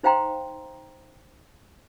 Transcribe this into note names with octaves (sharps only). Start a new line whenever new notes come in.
D#4 C5 F5 G5 A#5 C6